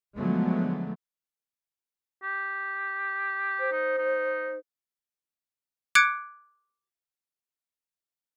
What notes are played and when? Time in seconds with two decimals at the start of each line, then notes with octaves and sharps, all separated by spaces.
0.16 D3 F3 F#3 G#3 A3 B3
2.23 G4
3.60 C5
3.73 D#4
3.99 D#4
5.95 D6 F#6 G#6 C#7 D7